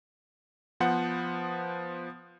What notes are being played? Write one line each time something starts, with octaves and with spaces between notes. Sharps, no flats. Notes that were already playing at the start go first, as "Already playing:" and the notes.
F3 B3 C5 F#5